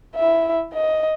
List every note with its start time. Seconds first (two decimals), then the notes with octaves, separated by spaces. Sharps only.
0.16 E4 E5
0.73 D#5